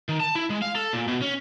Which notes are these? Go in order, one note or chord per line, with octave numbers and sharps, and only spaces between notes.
D#3
A5
E4
G#3
F5
A4
A#2
B2
C#4